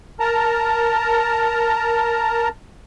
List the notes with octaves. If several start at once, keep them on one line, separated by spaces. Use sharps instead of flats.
A#4 A5 A#5